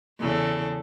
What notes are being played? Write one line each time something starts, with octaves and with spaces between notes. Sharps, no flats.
E2 C#3 A4